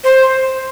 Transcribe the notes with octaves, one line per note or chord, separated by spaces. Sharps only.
C5